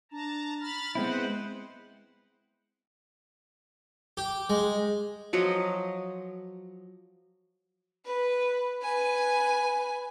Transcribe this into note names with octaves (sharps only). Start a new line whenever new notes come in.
D4 A5 A#5
B5 F6 A6
G#3 B3 C4 E4 B4 C5 F#5
G4
G#3
F3 F#3 B4 D#5
B4
B4 G#5